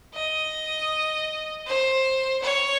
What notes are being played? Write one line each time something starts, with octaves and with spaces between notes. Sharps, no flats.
D#5
C5
C#5